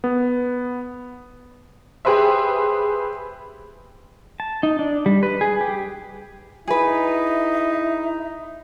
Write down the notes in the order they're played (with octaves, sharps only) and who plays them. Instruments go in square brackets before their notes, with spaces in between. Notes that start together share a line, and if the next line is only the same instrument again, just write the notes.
[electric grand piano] B3
[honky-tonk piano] G4 G#4 B4 C5 E5
[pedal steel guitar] A5
D#4
D4
G3
B4
G#4
G4
[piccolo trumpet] D#4 [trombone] E4 [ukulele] G#4 B4 [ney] E5